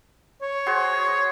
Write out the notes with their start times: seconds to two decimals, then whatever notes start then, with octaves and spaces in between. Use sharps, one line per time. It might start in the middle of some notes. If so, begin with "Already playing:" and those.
0.42 C#5
0.66 F#4 G#4 C5
1.08 D#5